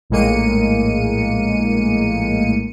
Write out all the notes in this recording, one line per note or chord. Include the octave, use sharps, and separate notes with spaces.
A#1 A2 G#3 A#3 C#7 D#7